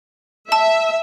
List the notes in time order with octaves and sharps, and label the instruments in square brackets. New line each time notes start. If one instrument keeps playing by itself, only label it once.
[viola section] E5 [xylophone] A5 E6